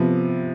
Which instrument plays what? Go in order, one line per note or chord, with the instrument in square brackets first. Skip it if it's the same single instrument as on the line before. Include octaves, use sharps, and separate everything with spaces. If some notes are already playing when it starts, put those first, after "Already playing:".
Already playing: [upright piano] C3 F3 B3